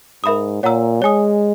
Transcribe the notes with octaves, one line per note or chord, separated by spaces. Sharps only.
G#2 A#4 E5 B5 D#6
A#2 C#5 F#5 A#5 E6
G#3 C#5 G#5 D#6